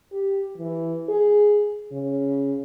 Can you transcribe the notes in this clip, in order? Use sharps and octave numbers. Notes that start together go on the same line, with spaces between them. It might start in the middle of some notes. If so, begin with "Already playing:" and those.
G4
E3
G#4
C#3